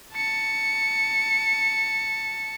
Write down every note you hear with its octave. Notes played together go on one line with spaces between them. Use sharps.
A5 C#7